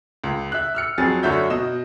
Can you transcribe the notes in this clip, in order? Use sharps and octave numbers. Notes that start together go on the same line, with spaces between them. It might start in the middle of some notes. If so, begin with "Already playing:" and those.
C#2
E5 F#6
E6 F6 C#7
F2 F#3 G#4 A6
F#2 D3 F#4 C#5 E5 G6
B2 D#5 E7